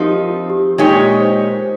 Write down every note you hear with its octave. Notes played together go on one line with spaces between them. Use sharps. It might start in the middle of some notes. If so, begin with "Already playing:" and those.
Already playing: F3 C4 D#4 G4 A#4
F4
G4
A#2 G#3 D#4 G4 C#5
C5